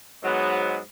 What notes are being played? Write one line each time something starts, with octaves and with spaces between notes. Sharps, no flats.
G#2 F#3 B3